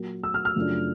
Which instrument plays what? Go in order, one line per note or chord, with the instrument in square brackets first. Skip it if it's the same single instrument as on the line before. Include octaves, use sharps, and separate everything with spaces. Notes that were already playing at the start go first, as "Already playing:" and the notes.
Already playing: [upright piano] A#2 F#3 A#3
E6
F6
F6
F#2 C#3 F3 A3 D4